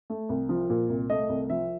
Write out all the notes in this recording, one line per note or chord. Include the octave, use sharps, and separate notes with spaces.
A3
C2
F3
A#2
C2
A3 D#5
C2
F3 E5